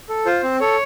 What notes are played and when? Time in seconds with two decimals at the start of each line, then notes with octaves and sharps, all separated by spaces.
0.09 A4
0.26 F4 C5
0.43 C4
0.60 A4 C#5